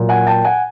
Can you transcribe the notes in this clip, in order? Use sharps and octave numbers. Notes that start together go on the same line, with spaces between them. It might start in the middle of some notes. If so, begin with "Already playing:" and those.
Already playing: A#2 F#3 A#3
F#5 G#5
G5 A5
F#5 G#5